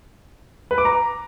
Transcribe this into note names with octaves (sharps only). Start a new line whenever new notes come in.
B4
D6
A#5